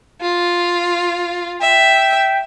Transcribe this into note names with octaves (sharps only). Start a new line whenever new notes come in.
F4
E5 G5